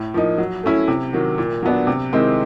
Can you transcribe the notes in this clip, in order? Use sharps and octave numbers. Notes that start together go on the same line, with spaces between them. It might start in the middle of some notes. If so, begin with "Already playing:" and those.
Already playing: A2
F3 A#3 D#4
F#3
A3 C#4 E4
C3
D#3 F#3
A#2
F#3 B3 D4
C3
D#3 G#3 C4 E4